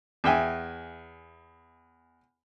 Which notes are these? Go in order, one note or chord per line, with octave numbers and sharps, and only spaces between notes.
E2 E5 G5 G#5